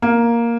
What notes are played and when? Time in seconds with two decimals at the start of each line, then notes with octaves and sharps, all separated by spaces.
0.02 A#3